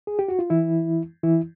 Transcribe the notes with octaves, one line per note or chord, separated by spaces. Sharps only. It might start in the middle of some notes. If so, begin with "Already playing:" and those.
G#4
G4
F#4
F4
E3 E4
E3 E4